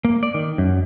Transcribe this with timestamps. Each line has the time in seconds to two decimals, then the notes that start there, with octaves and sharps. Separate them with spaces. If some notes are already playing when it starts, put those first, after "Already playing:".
0.05 A#3
0.23 D5
0.34 D#3
0.58 F#2